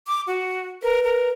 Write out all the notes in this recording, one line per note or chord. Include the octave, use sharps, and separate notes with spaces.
D6
F#4
A#4 B4
A#4